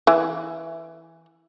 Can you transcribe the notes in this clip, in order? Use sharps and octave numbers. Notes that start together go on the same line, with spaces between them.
E3